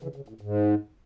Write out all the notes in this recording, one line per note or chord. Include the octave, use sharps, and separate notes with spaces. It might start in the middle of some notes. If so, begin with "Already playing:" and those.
C#3 E3
C#3
A2
G#2